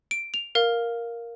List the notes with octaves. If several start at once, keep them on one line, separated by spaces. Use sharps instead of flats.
D7
F7
A#4 F5